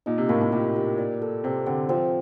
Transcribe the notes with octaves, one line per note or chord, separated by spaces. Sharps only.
A#2 D#4
C3
A2 A#3
A2
A#2 G4
G4
D5
A4
C3 C4
D3 C4
F3 C4